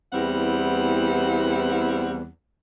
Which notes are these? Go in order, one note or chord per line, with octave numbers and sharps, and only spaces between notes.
E2 G3 B3 C4 E4 F#5